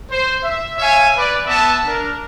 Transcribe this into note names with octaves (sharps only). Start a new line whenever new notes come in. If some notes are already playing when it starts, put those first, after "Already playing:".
C5
E5
C#5 E5 F5 G#5
B4 D5
B3 E5 A5
D4 A#4